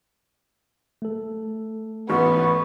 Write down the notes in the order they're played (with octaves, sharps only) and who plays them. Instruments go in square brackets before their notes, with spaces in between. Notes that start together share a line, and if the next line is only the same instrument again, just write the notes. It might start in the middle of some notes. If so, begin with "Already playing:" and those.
[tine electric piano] A3 A4
[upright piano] A1 G#2 [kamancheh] B3 [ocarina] C#6